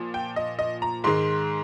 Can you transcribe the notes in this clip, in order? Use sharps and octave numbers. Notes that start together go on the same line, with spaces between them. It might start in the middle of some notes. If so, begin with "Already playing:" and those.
Already playing: A#2 F3
G5
D#5
D#5
A#5
G#2 D#3 G#3 C6